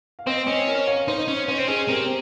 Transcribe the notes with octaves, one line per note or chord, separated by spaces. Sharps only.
F5
C4 C5 D#5
C#4 C5 D#5
A#4 C#5
C#5 F5
D#4 C5 D#5
C#4
C#4 C5 D#5
C4
C#4 G#4 C5
C4 G4 A#4